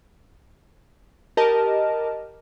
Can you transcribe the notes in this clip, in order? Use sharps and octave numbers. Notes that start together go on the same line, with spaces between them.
G4 A#4 D#5 A5